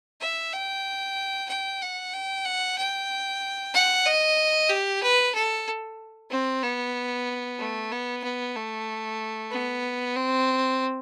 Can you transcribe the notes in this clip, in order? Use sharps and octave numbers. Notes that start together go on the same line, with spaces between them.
E5
G5
G5
F#5
G5
F#5
G5
F#5
D#5
G4
B4
A4
C4
B3
A3
B3
B3
A3
B3
C4